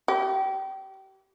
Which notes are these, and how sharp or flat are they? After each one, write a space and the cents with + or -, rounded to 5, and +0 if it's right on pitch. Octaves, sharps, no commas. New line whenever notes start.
G4 -30